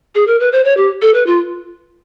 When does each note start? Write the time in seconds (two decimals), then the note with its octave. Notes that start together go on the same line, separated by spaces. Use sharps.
0.15 G#4
0.27 A#4
0.40 B4
0.52 C5
0.65 C#5
0.77 G4
1.02 A4
1.14 B4
1.26 F4